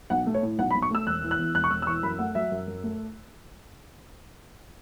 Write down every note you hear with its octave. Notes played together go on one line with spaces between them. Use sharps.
B1 F#5
A3
C#5
A2
B1 F#5
B5
B1
C#6
A3 E6
E1 F#6
E3
F#6
E2
E1 F#6
C#6
E1 E6
E6
E3 C#6
F#2 B5
A3 F#5
F#3 E5
F#2
F#2
A3